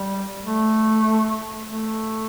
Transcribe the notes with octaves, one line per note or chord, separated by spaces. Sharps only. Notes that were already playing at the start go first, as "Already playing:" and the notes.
Already playing: G3
A3
A3